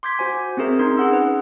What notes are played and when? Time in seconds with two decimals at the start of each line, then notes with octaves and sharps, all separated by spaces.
0.03 C6 D6 G6 G#6 B6
0.19 F#4 C5 G#5
0.57 C4 C#4 G#4 A#4 E5
0.79 C#4 D#4 C6
0.97 G#4 F#5 E6
1.13 B4